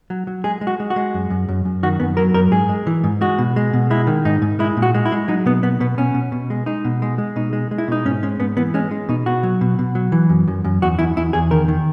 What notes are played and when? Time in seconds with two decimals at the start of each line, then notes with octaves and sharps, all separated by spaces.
0.10 F#3
0.27 F#3
0.44 G#3 G#4
0.61 G#3
0.67 F#4
0.80 G#3
0.90 F#4
0.96 G#3
1.14 F#2
1.30 F#2
1.49 F#2
1.65 F#2
1.83 D#3 F#4
2.00 F#2 B3
2.17 F#3 A#4
2.34 F#2 A#4
2.51 G#2 G#4
2.69 G#3
2.87 E3
3.04 G#2
3.21 G#3 F#4
3.38 B2
3.56 G#3
3.73 B2
3.90 G#3 E4
4.07 D#3
4.25 G#2 D#4
4.42 G#2
4.59 G#3 E4
4.77 A#2
4.82 F#4
4.95 G#3
5.05 E4
5.12 G#3
5.28 F#3 D#4
5.46 B2 B3
5.63 B2 B3
5.80 B2 B3
5.98 B2 C#4
6.14 B2
6.32 B2
6.50 G#3
6.66 G#3 D#4
6.85 B2
7.02 G#3
7.18 G#3
7.36 B2 D#4
7.53 G#3
7.71 G#3
7.78 E4
7.88 B2 D#4
8.05 G#2 C#4
8.23 G#3 C#4
8.40 G#2 B3
8.57 E3 B3
8.74 G#3 C#4
8.91 G#3
9.09 B2 D#4
9.26 B2 F#4
9.43 F#3
9.61 B2
9.79 B2
9.95 F#3
10.12 E3
10.29 F#2
10.48 F#2
10.65 F#2
10.82 E2 F#4
10.99 E2 E4
11.16 E2 E4
11.33 E2 G#4
11.51 D#3 A#4
11.68 D#3